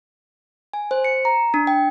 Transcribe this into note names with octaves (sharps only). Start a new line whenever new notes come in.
G#5
C5
C#7
A#5
D4
G5